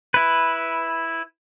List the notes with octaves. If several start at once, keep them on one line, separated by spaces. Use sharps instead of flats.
E4 B4